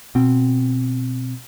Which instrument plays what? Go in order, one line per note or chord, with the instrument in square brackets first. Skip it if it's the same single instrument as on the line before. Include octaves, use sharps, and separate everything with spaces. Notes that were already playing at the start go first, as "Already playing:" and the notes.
[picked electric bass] B2 C4